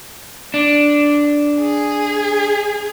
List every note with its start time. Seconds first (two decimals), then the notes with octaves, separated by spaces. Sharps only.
0.54 D4
1.61 G#4